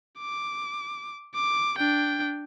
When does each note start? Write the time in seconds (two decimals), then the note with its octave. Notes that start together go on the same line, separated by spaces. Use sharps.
0.19 D6
1.35 D6
1.78 D4 G5